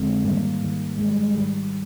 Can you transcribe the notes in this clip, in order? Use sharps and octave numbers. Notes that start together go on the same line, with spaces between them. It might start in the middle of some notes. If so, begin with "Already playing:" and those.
Already playing: F2 D3 G#3 C4
G#2 D#3 G3 A#3
G#2 D#3
G#2 D#3 G#3
G3
G#3
G#2 D#3 G3